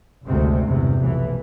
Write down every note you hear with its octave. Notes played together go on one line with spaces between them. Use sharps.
F#1 D2 C3 G#3 C4
G1 E2 C3
F1 B1 E3